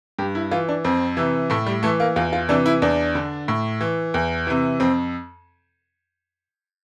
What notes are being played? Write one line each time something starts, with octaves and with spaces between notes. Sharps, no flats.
G2 G4
E4
E3 F4
D4
F2 C4
C3 E3
A2 A3
G3
E3 A3
A#3
E2 F4
F4
C3 E3 D4
E4
E2 D4
D3
A2
E3
E2
C3 E3
F2 C4